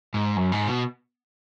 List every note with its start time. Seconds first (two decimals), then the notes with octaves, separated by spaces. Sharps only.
0.14 G#2
0.37 F#2
0.52 G#2
0.67 B2